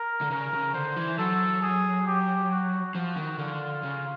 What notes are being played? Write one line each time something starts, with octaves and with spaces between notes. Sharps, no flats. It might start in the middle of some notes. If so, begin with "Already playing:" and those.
Already playing: A#4
D3
C#3 A#4
C#3
D3 C5
E3
F#3 A4
G#4
G4
F#4
F3 F#4
D#3
D3 F4
C#3